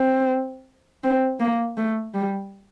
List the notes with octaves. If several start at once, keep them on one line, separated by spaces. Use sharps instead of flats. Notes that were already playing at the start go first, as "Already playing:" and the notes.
Already playing: C4
C4
A#3
A3
G3